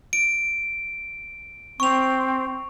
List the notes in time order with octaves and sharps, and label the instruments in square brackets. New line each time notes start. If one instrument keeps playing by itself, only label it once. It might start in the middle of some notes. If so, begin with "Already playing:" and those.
[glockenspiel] D7
[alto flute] C4 [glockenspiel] C#6 F7